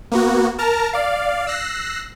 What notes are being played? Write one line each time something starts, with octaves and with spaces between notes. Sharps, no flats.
A#3 B3 F#4
A#4 A5 A#5 F6
D5 F5
E6 F#6 A#6 C7